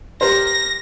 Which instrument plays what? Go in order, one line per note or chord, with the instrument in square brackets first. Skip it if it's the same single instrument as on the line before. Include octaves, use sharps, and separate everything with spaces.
[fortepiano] G4 A#4 C5 [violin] A#6